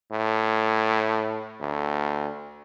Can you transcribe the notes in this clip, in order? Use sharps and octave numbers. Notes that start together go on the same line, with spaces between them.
A2
D2